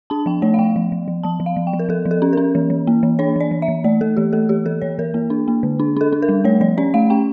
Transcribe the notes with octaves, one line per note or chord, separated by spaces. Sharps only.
D4 A5
F3 G5
A3 C#5
F5
F3 G5
F3
F3
F3
F3 A5
F3
F5
F3
G5
F3
A#4
F3 A4
F3
A4
C#4
C#4 A#4
E3
E3
A#3
E3
D4 C#5
E3 D5
E3
E5
E3
A3 D5
A3 A4
E3 G4
A3 A4
E3 G4
E3 A4
E3 C#5
E3 A#4
A#3
D4
A#3
D3
D4
D4 A4
D4
A#4
G3
A3 C#5
F3 C#5
C#4 D5
A3 F5
C#4 G5